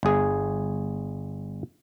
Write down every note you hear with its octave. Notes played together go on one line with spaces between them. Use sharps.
G1 G#4